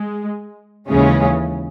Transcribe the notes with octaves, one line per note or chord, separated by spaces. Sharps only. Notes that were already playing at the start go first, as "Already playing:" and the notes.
Already playing: G#3
D#2 C#3 E3 G#3 C#4